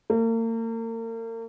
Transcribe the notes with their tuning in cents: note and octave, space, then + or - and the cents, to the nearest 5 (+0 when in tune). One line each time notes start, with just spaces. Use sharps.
A#3 -40